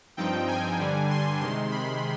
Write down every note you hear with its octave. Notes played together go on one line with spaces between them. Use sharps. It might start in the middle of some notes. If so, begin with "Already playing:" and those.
G2 F3 C4 D#4 G5
G#5
G2 D3 G3 D4
C6
C3 D#3 G#3 C6
B5